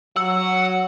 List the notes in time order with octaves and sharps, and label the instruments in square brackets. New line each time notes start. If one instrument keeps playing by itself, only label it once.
[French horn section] F#3 [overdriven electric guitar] F#5 [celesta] E6